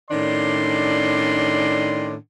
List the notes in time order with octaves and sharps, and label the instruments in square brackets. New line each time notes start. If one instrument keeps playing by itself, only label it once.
[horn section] A2 D#3 C#4 D4 D5 C6